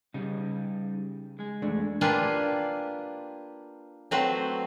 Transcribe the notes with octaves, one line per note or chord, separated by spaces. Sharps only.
C#3 G3 D#4
G#3 G#4
E2 A3 D4
A#3 D4 F4 G4 B4 G#5
F#3 A3 C4 B4 C5